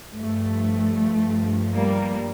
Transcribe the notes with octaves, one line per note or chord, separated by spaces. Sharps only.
G2 F3 A3
G3 A#3